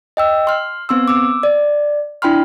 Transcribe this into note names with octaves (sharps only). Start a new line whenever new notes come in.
D#5 G5 E6
C6 F6
B3 C4 C6 E6
D6 E6
D5
D4 E4 G5 B5 C6 F6